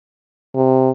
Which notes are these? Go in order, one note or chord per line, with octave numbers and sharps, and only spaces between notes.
C3